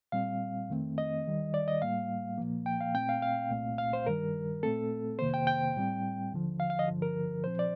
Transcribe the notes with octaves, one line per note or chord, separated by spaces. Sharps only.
A#2 G3 C4 F5
F2 D#3 A3 C4
D#5
D#2 D#3 G3
D5
D#5
A2 G3 A#3 F5
C2 A#2 F3 A#3
G5
F5
A#2 A3 C4 G5
F5
F5
C2 A#2 A3 C4
F5
C5
G2 D#3 G3 A#4
A#2 A3 C4 A4
F2 C3 D#3 A#3 C5
G5
G5
A2 G3 C4
D#2 D3 F3
F5
F5
D#5
G2 D3 F3
A#4
A#2 F3 C4 C5
D5